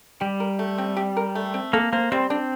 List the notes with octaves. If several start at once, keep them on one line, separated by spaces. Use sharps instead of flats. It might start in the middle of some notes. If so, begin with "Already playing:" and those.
G3 G4
A#4
A3
C4
G4
A#4
A3
C4
A#3 A4
A#3 C5
G3 C4
C4 D4